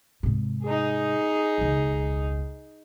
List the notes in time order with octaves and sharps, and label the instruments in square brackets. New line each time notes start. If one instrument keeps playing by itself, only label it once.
[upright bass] G#2 C3
[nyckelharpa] D#4 G#4
[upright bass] E1 C#2